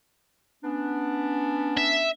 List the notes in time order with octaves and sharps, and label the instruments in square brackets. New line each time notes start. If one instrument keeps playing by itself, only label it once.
[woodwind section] B3 C#4 D4
[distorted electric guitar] E5